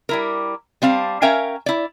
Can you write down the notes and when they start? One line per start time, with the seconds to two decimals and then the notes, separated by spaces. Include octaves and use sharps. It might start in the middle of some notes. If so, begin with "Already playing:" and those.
0.09 G3 E4 A#4
0.82 G3 C4 F5 A5
1.22 C#4 A#4 E5 F5 G5 G#5
1.66 E4 D5